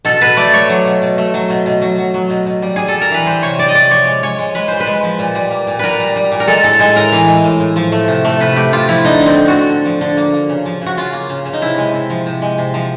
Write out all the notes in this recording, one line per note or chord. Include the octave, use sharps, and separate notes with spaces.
B2 A4
B2 B4
A3 D5
A3 C#5
F#3
B2
B2
A3
F#3
B2
B2
F#3
F#3
F#3
B2
B2
G3
G3 G#4
A4
G3
A#4
E3 B4
G3 C5
C3 C#5
G3 D5
D#5
C3 D5
F3 C#5
G#3
G#3 C#5
G#3
G#3 B4
A#2 C5
B4
G#3
F3
A#2
G3
A#3
A#2
A#2 A#4 B4
G3
G3
A#2
A#4
G#3 A4
A2 A4
G#3 G#4
A2 A#4
E3
G#3
A2
A2
F3
A3
C3
A3
C3 B4
A3 G4
C3 F4
F3 E4
D3 D#4
D3
C4
D3
F#4
D3
D3
F3
D3
A#3
A#3
C#3
F3
C#3 F#4
C#3 F4
A#3
C#3
C#3
D#4
C3 E4
G#3
C3
F3
C3
G#3
C3
F3